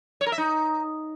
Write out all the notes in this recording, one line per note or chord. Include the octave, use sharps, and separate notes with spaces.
C#5
A#4
E5
D#4